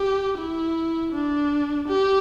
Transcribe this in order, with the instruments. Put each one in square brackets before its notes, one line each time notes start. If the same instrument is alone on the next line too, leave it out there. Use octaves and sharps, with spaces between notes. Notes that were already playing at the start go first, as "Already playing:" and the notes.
Already playing: [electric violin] G4
E4
D4
G4